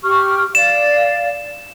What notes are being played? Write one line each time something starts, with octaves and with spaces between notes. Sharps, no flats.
G4 C#6 F6
D5 F5 E7